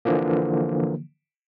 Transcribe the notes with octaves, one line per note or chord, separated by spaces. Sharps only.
D3 E3 F3 A#3